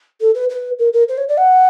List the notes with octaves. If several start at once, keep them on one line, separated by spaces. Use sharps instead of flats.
A4
B4
B4
A#4
A#4
C5
C#5
D5
F#5